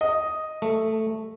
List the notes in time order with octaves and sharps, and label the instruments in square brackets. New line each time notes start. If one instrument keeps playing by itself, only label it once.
[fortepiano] D#5
[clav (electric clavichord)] A3